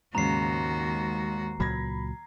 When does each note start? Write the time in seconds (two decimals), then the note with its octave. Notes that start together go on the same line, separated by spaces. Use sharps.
0.15 D#2 G#2 C#3 F#4 A#5 C7
1.60 C#2 A#2 F#3 B5 G#6 A#6